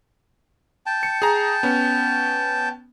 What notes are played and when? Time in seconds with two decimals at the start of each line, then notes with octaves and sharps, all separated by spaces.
0.86 G5 A5
1.03 C#7
1.22 G#4 A#5
1.63 B3 C#4